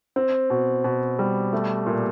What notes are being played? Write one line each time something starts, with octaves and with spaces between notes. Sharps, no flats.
C4
B2
B2
G3
A3
A#2